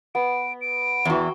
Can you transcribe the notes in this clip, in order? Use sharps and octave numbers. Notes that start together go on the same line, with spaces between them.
B3 D7
D7
E2 E3 F#4 G5